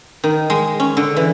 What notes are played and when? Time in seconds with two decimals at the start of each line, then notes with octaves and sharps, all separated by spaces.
0.24 D#3
0.50 G#3
0.80 C#4
0.97 D3
1.16 E3